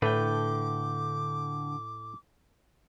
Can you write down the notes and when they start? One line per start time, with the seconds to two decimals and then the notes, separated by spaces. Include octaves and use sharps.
0.02 A2 D3 A3 B4 G5 D6